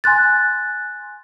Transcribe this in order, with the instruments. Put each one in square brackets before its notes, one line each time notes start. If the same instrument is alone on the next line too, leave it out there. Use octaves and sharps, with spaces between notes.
[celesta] G#5 C6 F#6 A6